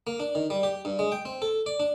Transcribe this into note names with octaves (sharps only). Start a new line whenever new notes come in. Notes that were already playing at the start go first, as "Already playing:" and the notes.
A#3
D4
D#3
G3
G4
G2
G#3
G5
C4
A4
D5
D4